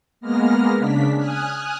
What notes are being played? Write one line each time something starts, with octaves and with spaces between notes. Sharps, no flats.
G#3 A#3 B3 F6 A#6
C#3 D4 B6
G#5 D#6 F6 F#6